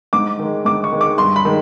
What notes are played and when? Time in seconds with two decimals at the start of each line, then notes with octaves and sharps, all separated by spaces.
0.13 G#2 D6
0.39 D#3 G#3
0.65 G#2 D6
0.84 C#6
0.92 D#3 G#3
1.01 D6
1.18 G2 C6
1.36 B5
1.45 D#3 G#3